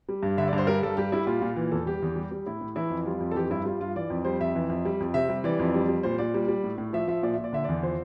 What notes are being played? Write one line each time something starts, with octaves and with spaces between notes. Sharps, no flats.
G3
G2
D3 E5
D5
G2
C5
G3 A#4
G2 A4
G3 G4
G3 E4
A#2 F4
A#2
E3
E2 A4
G3 G4
E2
G3
G3
A2 E4
A2
E3 E4
F2
G3 F4
F2
A4
E3 G4
G2 E4
G3 F4
G2 F4
E3 D5
F2
G3 C5
F2 E5
E3
F2
G3
F2
C3 E5
G3
E3 D5
F2
G3
G3
A#2 C5
A#2 D5
G3
G3
A2
A2
F3 E5
F3 E5
A#2 D5
A#2 E5
D5
D3 E5
E2 D5
F3 C5